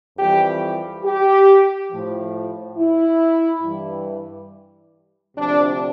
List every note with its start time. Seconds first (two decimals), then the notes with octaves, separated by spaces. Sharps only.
0.17 F2 E3 G3 G4
1.04 G4
1.91 A2 F3
2.77 E4
3.63 G2 E3 G3
5.36 D2 C3 F3 D4